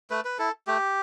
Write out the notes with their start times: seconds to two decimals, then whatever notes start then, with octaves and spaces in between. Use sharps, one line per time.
0.11 A3 B4
0.25 B4
0.39 E4 A4
0.67 A3 G4